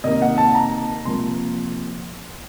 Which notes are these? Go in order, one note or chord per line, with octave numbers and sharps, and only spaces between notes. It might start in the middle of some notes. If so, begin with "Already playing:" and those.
C3 D#3 A#3 D#5
F#5
A5
A#5
C3 F3 A#3 C6